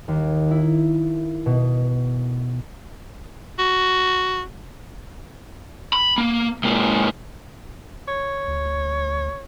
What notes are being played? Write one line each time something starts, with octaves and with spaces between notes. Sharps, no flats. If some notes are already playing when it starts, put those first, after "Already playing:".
D#2
E4
B2
F#4
B5
A#3
G#2 A#3
C#5
D2